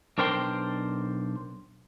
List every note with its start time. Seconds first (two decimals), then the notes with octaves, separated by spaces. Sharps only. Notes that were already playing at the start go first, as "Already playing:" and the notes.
0.18 B1 D4 A#4 C5 G5 C6